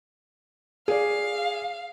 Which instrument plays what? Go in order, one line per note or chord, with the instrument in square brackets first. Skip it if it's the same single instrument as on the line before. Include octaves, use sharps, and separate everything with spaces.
[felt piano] G#4 D5 [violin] F5